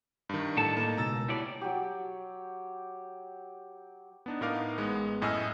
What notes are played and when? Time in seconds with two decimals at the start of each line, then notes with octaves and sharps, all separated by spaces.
0.29 G2 D#3
0.57 A2 D3 A4 F#5 A5 A6
0.77 A#3 D#4
0.97 C#2 B2 A#5 E6 A6
1.29 G3 B3 E4 C#5 D5 A5
1.61 F#3 G4
4.26 B3 D4 D#4
4.41 A2 B3 D#4 A#4 F5 D6
4.78 A1 G#3 B3
5.21 F#2 A2 D#5 G#5 E6 F6